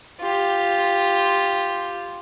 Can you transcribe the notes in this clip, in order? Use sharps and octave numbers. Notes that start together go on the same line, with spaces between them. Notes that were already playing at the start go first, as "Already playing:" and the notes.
F4 G4